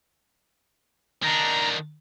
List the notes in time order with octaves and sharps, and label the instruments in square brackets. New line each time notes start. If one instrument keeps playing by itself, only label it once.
[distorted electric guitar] D#3 D4 [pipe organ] A#5